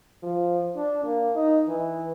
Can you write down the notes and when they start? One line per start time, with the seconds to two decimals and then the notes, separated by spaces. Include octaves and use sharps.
0.23 F3
0.76 D4
1.05 A#3
1.36 D#4
1.68 E3